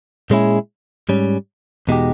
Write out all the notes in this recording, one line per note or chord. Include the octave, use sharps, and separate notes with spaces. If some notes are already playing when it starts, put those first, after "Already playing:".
A#2 G#3 C#4 E4 G#4
G#2 G3 C#4
E2 B2 G#3 D#4 G4